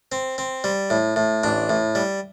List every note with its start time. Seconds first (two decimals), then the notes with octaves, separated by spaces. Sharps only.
0.12 C4
0.38 C4
0.64 G3
0.90 A2
1.16 A2
1.44 A1 D4
1.70 A2
1.95 G3